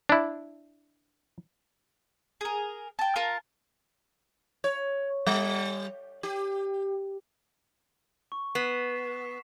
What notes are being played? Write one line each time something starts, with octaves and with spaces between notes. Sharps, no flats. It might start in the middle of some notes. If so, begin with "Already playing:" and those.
D4 E4
G#4 A#4
G5 A5
F4 A#4 A5
C#5
G3
G4
C#6
B3 B6 C7 E7